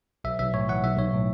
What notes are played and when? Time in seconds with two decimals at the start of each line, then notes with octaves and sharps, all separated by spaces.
0.24 B1 E5
0.39 B1 E5
0.54 A2 C#5
0.68 E3 F#5
0.83 B1 E5
0.98 B1 C#5
1.14 A2